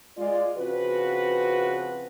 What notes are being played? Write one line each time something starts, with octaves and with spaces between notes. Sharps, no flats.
G#3 F4 D5
C#3 F3 C4 F#4 B4